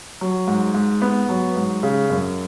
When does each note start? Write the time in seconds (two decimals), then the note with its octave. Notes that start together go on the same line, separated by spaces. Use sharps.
0.21 F#3
0.47 G#2
0.75 G#2
1.02 B3
1.29 F#3
1.56 G#2
1.83 C#3
2.10 F#2